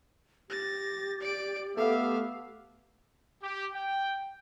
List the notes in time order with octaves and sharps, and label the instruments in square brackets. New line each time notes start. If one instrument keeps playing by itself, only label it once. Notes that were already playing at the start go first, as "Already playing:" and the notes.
[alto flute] G4 [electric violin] A6 A#6
[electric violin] D5 D7
[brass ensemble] A3 B3 E5 [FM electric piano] A4 D6 [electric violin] F5
[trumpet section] G4
G5